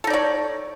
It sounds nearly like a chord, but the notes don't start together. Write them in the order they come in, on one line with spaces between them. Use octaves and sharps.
A4 D#4 D5 C#5